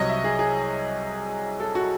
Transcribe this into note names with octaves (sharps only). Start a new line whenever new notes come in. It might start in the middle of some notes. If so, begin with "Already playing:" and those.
Already playing: C2 C3 F#3 C#5 D#5
E5
G#4
G#4
A4
F#4